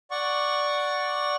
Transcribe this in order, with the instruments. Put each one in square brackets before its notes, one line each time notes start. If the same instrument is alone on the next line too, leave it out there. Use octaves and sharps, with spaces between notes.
[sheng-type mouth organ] D5 F#5 C#6